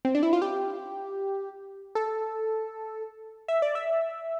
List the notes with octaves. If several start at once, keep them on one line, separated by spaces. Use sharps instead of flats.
C4
D4
E4
F4
G4
A4
E5
D5
E5